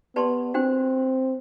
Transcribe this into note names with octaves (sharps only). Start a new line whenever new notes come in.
B3 G4 B4 D5 A5 C6
C4 D4 F#4 C5 G5